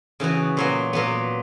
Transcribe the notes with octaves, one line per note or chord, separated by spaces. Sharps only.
C#3 E3 B3 F#4
A#2 F#3 B3
A#2 F#3 B3